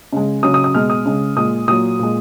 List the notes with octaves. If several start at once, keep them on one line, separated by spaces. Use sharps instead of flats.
C#3 G#3
C#3 F#3 D#6
D#6
D#6
B2 G#3 F6
D#6
C#3 G#3
A#2 G#3 D#6
A#2 F#3 D#6
A#2 G#3